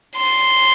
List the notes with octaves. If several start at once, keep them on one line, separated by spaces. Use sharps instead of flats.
C6